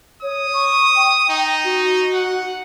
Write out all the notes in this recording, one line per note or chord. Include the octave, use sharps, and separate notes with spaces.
C#5 D#6
C#6
G5
D#4
F#4
F#5